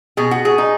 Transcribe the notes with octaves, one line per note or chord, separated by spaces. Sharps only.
B2 G#4
F#4
G#4
D#4